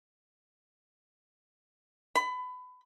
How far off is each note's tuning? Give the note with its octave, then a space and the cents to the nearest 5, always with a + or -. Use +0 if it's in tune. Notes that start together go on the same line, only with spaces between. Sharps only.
B5 +25